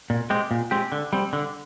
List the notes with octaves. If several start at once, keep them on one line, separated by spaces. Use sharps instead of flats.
A#2
G#3 C4 G4
A#2
G#3 C4 G4
D3
G3 C4
D3